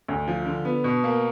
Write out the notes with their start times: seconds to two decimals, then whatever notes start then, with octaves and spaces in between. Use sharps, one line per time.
0.08 D2
0.28 F3
0.45 D3
0.65 B3
0.84 B2
1.04 A#3